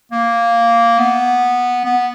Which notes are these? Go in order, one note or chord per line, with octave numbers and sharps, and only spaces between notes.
A#3
B3
B3